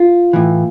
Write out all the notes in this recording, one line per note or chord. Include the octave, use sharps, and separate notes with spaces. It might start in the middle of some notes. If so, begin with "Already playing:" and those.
Already playing: F4
A2 E3